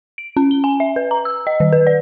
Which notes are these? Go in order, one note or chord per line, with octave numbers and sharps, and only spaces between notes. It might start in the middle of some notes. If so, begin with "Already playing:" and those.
D7
C#4
G7
G#5
E5
B4
A#5
E6
D#5
D#3
B4
D5